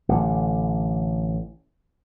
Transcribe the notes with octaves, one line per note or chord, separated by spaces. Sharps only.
A1 D3